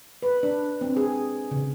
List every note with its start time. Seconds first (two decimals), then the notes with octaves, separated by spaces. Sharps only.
0.22 B4
0.43 D4
0.81 C4
0.97 G#4
1.51 C#3